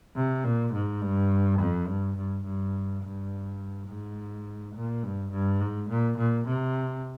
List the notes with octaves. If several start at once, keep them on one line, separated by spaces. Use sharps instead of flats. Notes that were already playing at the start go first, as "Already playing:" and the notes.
C3
A#2
G#2
G2
F2
G2
G2
G2
G2
G#2
A#2
G2
G2
G#2
A#2
A#2
C3